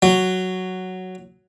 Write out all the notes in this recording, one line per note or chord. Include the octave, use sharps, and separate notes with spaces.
F#3